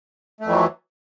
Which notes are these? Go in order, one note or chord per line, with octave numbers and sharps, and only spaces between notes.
F2 E3 F#3 A3